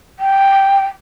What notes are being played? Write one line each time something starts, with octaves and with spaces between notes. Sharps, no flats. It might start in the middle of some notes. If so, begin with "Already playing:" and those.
G5